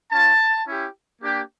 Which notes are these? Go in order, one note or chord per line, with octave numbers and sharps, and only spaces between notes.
C#4 F4 A5
C#4 E4 G4
A#3 D4 G4